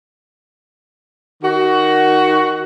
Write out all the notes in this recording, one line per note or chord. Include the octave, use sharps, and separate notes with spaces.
D#3 F#4